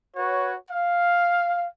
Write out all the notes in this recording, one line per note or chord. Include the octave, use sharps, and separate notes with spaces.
F#4 B4 C#5
F5